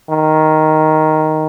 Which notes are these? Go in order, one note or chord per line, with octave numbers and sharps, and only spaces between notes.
D#3